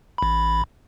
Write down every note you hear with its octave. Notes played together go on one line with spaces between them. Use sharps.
A1 B5